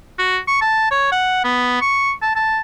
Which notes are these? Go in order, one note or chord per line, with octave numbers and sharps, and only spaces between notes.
F#4
C#6
A5
C#5
F#5
B3
C#6
A5
A5